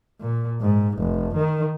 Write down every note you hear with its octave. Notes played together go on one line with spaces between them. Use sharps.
A#2
G#2
F1
D#3